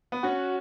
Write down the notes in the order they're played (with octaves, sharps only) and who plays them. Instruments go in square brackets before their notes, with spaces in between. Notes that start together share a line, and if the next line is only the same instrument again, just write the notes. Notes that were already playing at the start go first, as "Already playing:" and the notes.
[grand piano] B3
[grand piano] C#4 [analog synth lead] F#4